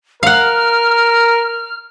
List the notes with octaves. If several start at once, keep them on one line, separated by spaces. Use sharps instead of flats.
A#4 F5 F#5 F6